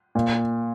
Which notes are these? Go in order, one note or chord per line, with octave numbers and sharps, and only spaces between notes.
A#2